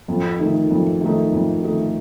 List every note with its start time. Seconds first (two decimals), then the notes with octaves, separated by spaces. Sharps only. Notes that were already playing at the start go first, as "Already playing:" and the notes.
0.08 F2
0.39 D#3 A3 D#4
0.70 F2
1.01 D#3 A3 D#4
1.32 F2
1.63 D#3 A3 D#4